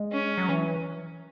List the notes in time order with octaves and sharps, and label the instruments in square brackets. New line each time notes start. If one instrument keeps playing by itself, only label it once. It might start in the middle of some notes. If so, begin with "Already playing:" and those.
Already playing: [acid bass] G#3
[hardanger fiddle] C#4
[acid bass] F#3
E3